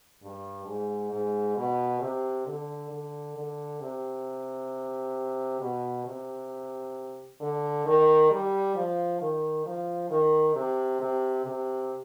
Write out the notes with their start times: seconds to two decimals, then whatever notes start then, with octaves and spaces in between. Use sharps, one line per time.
0.22 G2
0.66 G#2
1.11 G#2
1.57 B2
2.01 C3
2.46 D3
2.91 D3
3.36 D3
3.81 C3
5.61 B2
6.06 C3
7.41 D3
7.86 D#3
8.31 G3
8.75 F3
9.21 D#3
9.65 F3
10.10 D#3
10.55 C3
11.01 C3
11.45 C3